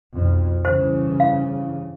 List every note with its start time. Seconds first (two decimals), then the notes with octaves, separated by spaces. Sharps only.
0.15 B1 F2
0.65 G2 C#3 E3 C5
1.20 F5